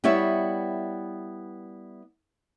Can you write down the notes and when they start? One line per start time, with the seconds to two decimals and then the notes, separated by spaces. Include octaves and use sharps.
0.04 G3 B3 E4 C#5 E5